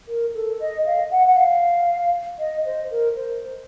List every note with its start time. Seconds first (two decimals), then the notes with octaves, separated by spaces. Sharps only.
0.08 A#4
0.34 A4
0.60 D#5
0.86 F5
1.11 F#5
1.27 F#5
1.36 F5
2.39 D#5
2.65 C5
2.91 A#4
3.16 C5